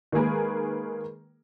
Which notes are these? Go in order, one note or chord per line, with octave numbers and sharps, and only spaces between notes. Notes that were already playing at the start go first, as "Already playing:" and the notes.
D#3 G#3 A#3 G#4 A#4 B4